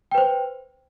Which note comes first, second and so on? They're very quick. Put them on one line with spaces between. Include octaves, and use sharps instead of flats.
G5 B4 C5